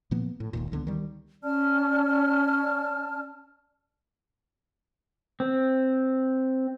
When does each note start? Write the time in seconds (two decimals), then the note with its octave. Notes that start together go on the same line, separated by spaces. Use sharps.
0.11 A#2 F3 A#3 B3
0.40 A2
0.53 E1 D#2 A#2
0.72 C#2 D3 F3 B3
0.87 D#3 G3
1.43 C#4 D5 A5 F6
5.40 C4